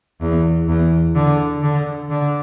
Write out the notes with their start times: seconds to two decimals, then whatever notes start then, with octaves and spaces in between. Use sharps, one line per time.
0.21 E2
0.68 E2
1.15 D3
1.63 D3
2.10 D3